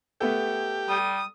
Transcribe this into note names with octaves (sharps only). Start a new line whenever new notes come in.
A3 B3 G4 A4
G3 D#6